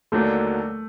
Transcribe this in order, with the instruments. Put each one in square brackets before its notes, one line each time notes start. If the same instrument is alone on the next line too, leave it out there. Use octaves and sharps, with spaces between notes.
[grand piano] D#2 D3 F#3 A#3 D4 [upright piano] A3